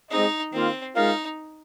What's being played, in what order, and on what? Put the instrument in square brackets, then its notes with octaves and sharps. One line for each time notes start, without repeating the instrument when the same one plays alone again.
[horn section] G#3 C4 G#4 D#5 [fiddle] D#4
[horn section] D#3 A#3 F4 [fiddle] C4
[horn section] G#3 F4 A#4 F5 [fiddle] D#4